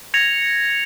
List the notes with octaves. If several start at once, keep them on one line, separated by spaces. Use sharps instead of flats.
G#6 A#6 C#7 F7